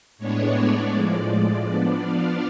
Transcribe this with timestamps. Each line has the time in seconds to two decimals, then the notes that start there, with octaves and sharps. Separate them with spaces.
0.18 A2 G#3 B3 D4 C#5
0.54 D5
0.91 A2 F3 G#3 D5
1.63 F3 B3 D4 D5
2.00 F5